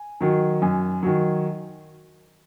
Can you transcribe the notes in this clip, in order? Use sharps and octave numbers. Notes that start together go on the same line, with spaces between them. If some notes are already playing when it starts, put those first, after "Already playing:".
Already playing: G#5
D#3 F#3
F#2 G#5
D#3 F#3